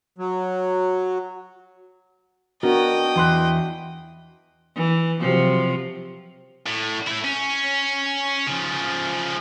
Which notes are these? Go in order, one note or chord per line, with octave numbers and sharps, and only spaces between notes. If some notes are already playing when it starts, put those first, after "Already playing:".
F#3
B3 D4 F#4 A#4 D#5 G5
E2 E3 E4 C6 F#6
E3
C3 F3 F#3
A2
A3 E4
C#4
C#3 F3